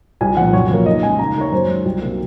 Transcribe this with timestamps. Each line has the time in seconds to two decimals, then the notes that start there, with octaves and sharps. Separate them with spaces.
0.21 C2 G#5
0.37 A#2 F3 F#5
0.53 F#2 C#5
0.70 F3 A#3
0.86 D#2 D#5
1.03 C#3 G#3 G#5
1.19 D#2 A#5
1.36 D#3 A#3 C#5
1.52 F#2 C5
1.69 D#3 G#3
1.85 C2
2.01 C3 D#3 F#3 A#3